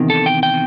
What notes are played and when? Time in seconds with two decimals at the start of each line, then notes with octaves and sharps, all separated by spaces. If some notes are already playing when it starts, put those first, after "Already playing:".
Already playing: E2 C3 D#3
0.10 A4
0.26 G5
0.43 G5